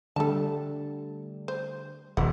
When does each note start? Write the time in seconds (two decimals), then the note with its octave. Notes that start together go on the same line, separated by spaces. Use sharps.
0.16 D3 G3 A3 A4 A5
1.48 C5
2.17 D#1 F#5